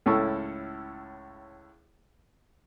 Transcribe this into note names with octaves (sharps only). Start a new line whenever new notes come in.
C#2 A2 C#4 E4 A4 C#6